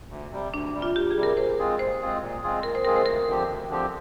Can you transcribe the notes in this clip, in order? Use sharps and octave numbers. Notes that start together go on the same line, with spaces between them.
D2
C3 G3
D2 D4
C3 G3
F4
D2 G4
G#4
C3 G3
A#4
A#2 C5
G#3 C4 F4 G#4
A#2 C5
G#3 C4 F4 G#4
A#2
G#3 C4 F4 G#4
A#2 A#4
C5
G#3 C4 F4 G#4 A#4
C5
D2 A#4
D3 F3 C4 G4
D2
D3 F3 C4 G4